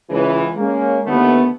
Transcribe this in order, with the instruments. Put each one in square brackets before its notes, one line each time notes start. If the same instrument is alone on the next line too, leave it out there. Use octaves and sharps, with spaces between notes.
[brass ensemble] C#2 E3
G#3 A#3 C#4
D#2 D3 E3 A3 B3